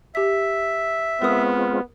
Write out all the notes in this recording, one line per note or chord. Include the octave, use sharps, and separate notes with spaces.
G4 E5 B6
G#3 B3 C4 F4 A#4 D#6